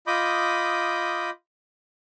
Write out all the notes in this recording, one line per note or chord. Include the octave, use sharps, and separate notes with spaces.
F4 D#5 B5 D6 D#6 G6